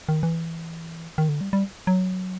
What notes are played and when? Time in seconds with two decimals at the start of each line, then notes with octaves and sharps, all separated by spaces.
0.09 D#3
0.23 E3
1.18 D#3
1.29 D3
1.41 G3
1.53 G3
1.87 F#3